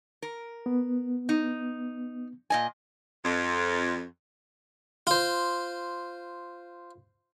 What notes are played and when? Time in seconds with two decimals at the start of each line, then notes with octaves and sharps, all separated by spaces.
0.22 A#4
0.66 B3
1.29 D#4
2.50 A#2 D#5 G#5
3.23 F2
5.07 F4 C5